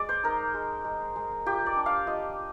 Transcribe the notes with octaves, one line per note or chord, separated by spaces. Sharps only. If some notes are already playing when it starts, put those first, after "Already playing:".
Already playing: G#3 D5
C5
D#4 A#4
G#3
G#3
G#3
F4 G4
D5
D4
F5
F4 D#5